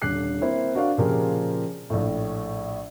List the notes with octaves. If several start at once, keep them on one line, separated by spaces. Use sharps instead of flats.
D#1 D3 D6 F#6 C7
A#3 C4 E4 C5
D4 F#4 A#4 D5 F5
A#2 C#3 F3 G4 G#4 A#4
A#1 A2